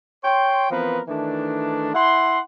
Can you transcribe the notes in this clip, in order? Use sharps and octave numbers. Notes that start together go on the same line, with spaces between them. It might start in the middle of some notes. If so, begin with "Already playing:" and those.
C#5 G5 C6
E3 F3 B3 C4 A#4 B4
D#3 E3 A3 D4
E4 F#5 C6